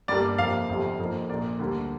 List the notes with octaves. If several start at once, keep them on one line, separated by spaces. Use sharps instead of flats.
G1 G2 G3 A#3 D5
F2 C3 A#3 F5
G1 F2 C3
F1 F2 F3 A#3
A#1 A#2 A#3 D5
D2 D3 G3 A#3